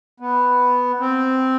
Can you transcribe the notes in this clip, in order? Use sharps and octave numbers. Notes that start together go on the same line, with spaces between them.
B3
C4